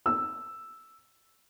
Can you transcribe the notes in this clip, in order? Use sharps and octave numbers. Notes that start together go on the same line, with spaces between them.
E6